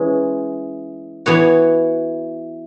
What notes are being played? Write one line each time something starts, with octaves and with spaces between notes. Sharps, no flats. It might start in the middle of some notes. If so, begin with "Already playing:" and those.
Already playing: E3 G#3 C#4
E3 B3 F#4 C#5